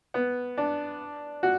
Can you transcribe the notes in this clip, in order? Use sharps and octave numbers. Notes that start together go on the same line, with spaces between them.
B3
D4
F#4